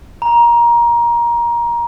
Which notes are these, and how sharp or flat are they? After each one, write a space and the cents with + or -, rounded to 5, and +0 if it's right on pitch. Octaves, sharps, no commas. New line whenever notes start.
A#5 +20